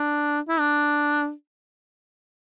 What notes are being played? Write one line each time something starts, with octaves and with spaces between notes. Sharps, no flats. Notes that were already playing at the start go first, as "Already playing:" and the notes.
Already playing: D4
E4
D4